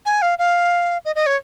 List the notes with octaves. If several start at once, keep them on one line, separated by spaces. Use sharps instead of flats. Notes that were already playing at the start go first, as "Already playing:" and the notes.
G#5
F5
F5
D#5
D#5
C#5